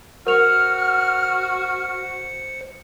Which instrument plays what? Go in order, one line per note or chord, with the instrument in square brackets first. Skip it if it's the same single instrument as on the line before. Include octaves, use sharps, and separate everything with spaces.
[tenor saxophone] F#4 [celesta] A#4 F7 [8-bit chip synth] C5 C#7 [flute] F6